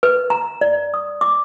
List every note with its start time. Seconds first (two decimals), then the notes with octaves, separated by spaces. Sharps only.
0.03 B4
0.30 A#5
0.61 D5
0.94 D#6
1.21 D6